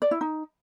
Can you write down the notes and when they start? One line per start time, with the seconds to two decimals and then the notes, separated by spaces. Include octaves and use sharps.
0.02 D5
0.11 E4
0.21 D#4